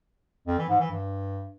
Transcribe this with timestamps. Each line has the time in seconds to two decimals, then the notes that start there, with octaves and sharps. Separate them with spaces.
0.47 F2
0.58 E3
0.69 G#2
0.80 E3
0.91 G2